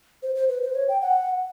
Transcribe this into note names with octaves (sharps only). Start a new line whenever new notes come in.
C5
C5
B4
C5
C#5
G5
F#5